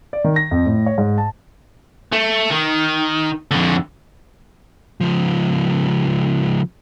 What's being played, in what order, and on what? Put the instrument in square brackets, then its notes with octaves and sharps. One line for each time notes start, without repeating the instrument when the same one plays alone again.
[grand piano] D5
D#3
A#6
F2
A2
C#5
G#2
A5
[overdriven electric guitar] A3
D#3
F2 D3
[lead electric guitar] C#2 F3